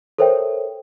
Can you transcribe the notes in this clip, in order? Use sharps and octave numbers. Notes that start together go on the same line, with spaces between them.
A4 A#4 C5 C#5 E5 G5